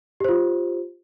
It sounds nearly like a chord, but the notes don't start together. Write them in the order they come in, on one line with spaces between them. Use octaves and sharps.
G4 C5 F4